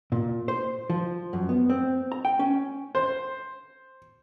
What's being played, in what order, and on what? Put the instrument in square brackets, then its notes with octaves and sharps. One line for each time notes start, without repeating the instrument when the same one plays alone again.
[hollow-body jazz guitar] A#2
C5
F3
F#2
B3
C4
A#5
G5
C#4
[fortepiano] C5